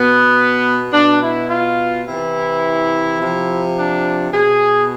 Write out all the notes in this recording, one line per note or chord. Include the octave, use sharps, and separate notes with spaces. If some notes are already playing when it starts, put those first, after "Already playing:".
Already playing: B2 B3
B2 D4
E4
F4
C3 E3 E4
C3 F3
D4
B2 G#4